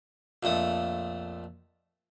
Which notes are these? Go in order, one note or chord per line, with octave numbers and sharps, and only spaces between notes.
A#1 F2 A3 D#6